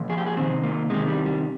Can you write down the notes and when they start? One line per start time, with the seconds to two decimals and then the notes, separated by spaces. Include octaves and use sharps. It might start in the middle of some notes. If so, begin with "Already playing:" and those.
Already playing: A#2 F3
0.09 G#4
0.17 G4
0.26 G#4
0.37 C3 D#3 C4
0.63 A#3
0.90 C3 D#3 G#3
1.08 G3
1.26 G3